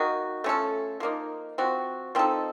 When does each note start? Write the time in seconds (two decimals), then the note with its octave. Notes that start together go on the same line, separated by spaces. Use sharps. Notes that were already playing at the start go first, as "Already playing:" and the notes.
Already playing: D#3 A#3 D#4 F#4
0.44 A3 C#4 F4 A4
1.00 F3 A#3 D#4
1.58 F3 C4 F#4
2.15 F3 C4 D#4 A4